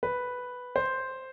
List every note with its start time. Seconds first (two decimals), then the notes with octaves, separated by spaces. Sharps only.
0.03 B4
0.76 C5